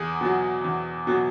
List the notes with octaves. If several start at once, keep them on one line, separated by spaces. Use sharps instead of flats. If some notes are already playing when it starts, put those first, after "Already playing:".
Already playing: E2 G#4
B2 F#3
E2
B2 F#3